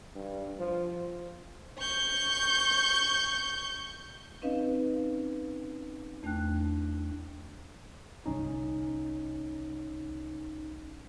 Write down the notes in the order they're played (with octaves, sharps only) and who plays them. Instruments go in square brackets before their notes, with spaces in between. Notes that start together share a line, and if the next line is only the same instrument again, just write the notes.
[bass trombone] G2
F3
[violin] C#6 G6
[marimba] C4 C#4 D#4 B4 D#5 F5
E2 A3 D4 G5 F#6
[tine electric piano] G1 C2 C#4 D#4